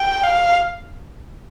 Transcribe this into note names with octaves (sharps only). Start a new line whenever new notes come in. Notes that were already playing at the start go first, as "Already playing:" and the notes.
Already playing: G5
F5